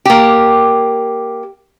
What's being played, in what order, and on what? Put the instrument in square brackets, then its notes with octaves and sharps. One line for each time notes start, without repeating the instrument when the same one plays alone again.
[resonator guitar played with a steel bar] A#3 G4